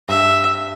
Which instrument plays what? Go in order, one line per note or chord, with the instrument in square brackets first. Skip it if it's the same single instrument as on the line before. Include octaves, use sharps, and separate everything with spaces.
[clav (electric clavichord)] G2 [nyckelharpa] E5